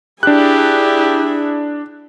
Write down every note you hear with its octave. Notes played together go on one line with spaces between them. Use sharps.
D4 E4 G4 G#4 F#6